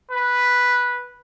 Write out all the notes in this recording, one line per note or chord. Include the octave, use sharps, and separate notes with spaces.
B4